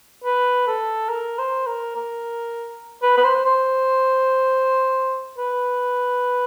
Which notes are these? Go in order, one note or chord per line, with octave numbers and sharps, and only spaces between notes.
B4
A4
A#4
C5
A#4
A#4
B4
B4
C5
C5
B4